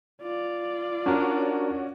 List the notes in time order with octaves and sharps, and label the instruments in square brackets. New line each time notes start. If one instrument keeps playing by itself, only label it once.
[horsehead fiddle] F4 D5
[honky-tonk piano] C#4 F#4 [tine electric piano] D4 A#4